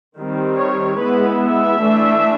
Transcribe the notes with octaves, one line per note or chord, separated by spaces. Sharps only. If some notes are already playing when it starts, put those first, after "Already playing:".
D#3 G3 C4
C#5
G#3 B3 E4 B4
E5
E3 A3 D4